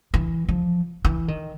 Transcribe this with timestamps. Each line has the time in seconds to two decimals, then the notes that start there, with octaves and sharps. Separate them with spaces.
0.14 E3
0.49 F3
1.05 E3
1.28 D#3